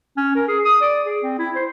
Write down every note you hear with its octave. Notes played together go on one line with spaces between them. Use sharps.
C#4
A#4
G#4
D#6
D5
G#4
C4
E4
C5